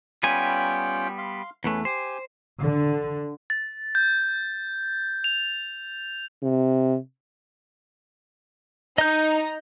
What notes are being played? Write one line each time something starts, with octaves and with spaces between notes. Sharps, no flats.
G3 B3 C#4 F4 G5 G#5
F5 C6
E2 A3 C#4 B4
G4 C5 G#5
D3
A6
G6
F7
C3
D#4 D#5 A#5 G6